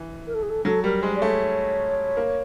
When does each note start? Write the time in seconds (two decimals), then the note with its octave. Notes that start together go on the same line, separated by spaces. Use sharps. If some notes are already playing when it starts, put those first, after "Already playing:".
Already playing: E3
0.27 A#4
0.34 A4
0.42 G#4
0.49 A4
0.65 F#3 A4
0.83 G3 A#4
1.03 G#3 C5
1.15 D5
1.21 A3 C#5
2.17 A#3